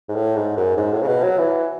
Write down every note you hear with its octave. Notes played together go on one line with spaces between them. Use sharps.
G#2
A2
G#2
F#2
G#2
A2
C#3
B2
F#3
E3